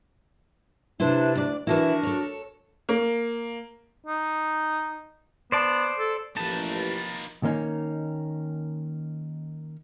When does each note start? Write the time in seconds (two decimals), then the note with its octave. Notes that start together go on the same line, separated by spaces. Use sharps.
1.00 C3 D4 E4 B4 C5
1.35 D2 D5
1.67 E3 F3 D4 E4 F#4 A#4
2.03 A4 C#5
2.89 A#3
4.07 D#4
5.52 B3 C5 D5 A5
5.99 A4
6.37 A1 F3 A#3 D#4 B4 A5
7.43 D#3 A#3 C#4 D#4